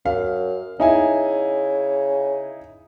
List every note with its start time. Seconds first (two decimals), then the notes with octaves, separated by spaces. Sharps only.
0.05 F#2 F5
0.80 C#3 D#4 E4 G#5